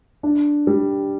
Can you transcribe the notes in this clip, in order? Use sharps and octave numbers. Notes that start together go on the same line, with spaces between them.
D4
G3